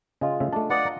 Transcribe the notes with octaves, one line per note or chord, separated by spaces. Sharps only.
C#3 G#3 F4
C#3 A3 E5
A3 D4 A5
B4 D5 D#5 F#5 D#6
A#5